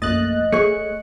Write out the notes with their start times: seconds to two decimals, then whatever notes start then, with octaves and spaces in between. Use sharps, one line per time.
0.02 A#1 F#2 A3 A#3 D#5 F#6 A6
0.52 A3 G#4 C#5 C#7